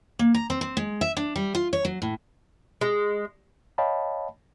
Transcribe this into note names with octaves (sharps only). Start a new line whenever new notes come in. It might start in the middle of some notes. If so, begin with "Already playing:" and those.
A#3
A#5
C4
C4
G#3
E5
D4
G3
F4
C#5
F#3
A2
G#3
C#5 D#5 F5 G5 A5 B5